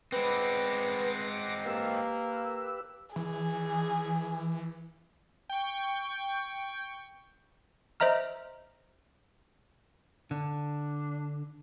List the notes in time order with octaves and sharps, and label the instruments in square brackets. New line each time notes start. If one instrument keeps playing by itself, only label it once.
[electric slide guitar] G#3 C4 [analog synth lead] B4 [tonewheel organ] F#5 D6 A#6
[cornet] A#3 [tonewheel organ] G4 B4 [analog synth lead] E6
[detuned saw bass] E3 [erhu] G#4
[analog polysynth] G5 C#6
[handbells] C5 D#5 E5 A#5 F6
[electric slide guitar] D3 [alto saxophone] D4